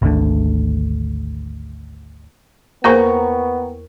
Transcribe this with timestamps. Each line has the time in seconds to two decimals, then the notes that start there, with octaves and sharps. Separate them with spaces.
0.02 G#1 D2 D3
2.84 E2 A#3 B3 A#4 C5 G5 A#5 C#6